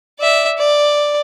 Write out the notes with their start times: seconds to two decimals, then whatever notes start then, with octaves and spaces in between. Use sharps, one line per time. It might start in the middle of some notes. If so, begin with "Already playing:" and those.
0.20 D5 E5
0.58 D5